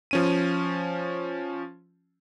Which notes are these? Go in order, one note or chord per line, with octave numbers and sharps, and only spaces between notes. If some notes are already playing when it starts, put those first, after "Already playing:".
F3 C#4 D#7